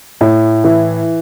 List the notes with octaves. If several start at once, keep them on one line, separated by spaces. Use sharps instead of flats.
A2
E3